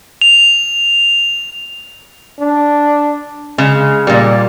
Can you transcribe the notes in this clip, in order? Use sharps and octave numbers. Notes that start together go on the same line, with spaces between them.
F7
D4
C#3 G#3
A#2 G3 A#3